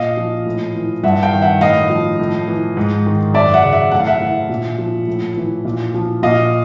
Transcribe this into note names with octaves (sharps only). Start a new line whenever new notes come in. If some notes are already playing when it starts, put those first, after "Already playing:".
Already playing: A#2 D#5 F5
F3
A2
E3
G2 E5 F#5
F5 G5
D#3
E5 F#5
A2 D#5 F5
F3
A2
E3
G#2
D#3
F#2 D5 E5
E5 F#5
C#3
E5 F#5
A2 F#5
F5
E5 F#5
E3
A#2
F3
A2
E3
A#2
F3
A#2 D#5 F5